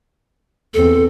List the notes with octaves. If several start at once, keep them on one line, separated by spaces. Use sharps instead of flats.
E2 C4 A4